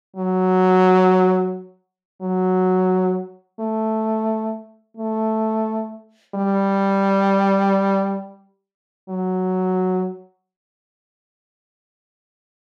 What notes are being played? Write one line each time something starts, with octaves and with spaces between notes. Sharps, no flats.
F#3
F#3
A3
A3
G3
F#3